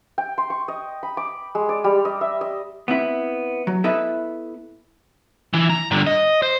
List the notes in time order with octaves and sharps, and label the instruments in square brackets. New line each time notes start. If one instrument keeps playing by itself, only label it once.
[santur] G5
C6
C#6
D#5
B5
D6
G#3
D5
G3
D#5
E5
D#5
[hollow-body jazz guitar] B3 C4 E4
F#3
B3 E4 A4 B4 D#5 E5
[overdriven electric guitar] E3 E4
A#5
G2 D3
D#5
C5